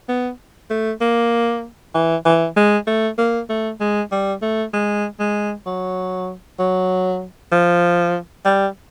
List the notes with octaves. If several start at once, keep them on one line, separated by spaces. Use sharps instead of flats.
B3
A3
A#3
E3
E3
G#3
A3
A#3
A3
G#3
G3
A3
G#3
G#3
F#3
F#3
F3
G3